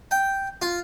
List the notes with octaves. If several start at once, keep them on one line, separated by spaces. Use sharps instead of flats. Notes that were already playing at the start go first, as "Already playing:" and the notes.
G5
F4